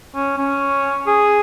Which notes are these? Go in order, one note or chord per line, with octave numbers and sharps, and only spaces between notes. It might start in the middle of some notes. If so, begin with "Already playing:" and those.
C#4
C#4
G#4